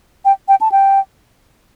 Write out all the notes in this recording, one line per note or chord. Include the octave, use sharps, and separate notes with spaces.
G5
G5
A5
G5